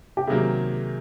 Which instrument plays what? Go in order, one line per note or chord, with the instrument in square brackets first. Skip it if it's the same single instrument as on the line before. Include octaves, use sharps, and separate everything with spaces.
[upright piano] G4
[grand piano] C3 D#3 F#3 A#3 [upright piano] G#4